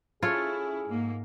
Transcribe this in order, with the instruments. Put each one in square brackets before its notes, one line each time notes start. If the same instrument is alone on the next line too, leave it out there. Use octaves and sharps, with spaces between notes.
[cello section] C#4 E4 [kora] F4 A4 C#5 [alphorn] G#4
[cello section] G#2 A#3